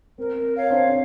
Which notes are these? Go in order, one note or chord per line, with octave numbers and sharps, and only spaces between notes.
C4 A#4
C#5 F5
C4 D4